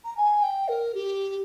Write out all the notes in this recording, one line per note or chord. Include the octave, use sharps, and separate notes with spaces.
A#5
G#5
G5
A#4
G4